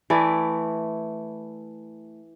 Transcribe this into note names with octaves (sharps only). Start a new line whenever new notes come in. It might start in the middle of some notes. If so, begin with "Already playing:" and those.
E3 A3 E4 D5